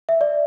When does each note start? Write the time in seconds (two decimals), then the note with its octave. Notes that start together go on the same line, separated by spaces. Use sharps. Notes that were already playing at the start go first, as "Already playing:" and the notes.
0.09 E5
0.21 D5